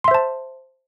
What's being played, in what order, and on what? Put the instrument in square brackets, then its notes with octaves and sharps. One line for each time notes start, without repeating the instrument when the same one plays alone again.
[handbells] C6
E5
C5
A5